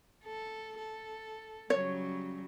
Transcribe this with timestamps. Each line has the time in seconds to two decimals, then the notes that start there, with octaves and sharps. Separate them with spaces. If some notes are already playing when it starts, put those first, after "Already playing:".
0.24 A4
0.78 A4
1.70 C#3 F#3 G3 C#5